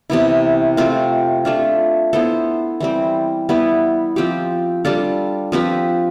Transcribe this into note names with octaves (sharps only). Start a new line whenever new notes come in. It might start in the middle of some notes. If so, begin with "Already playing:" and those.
C3 E3 B3 E4
A3 C4 F4
A3 D4 F4
B3 E4 A4 C5
E3 G3 C4
G3 B3 E4 B4
F3 C4 G4
G3 D4 F4 A4
F3 C4 G4 B4